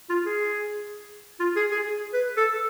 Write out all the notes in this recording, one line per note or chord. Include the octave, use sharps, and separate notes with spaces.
F4
G#4
F4
G#4
G#4
B4
A4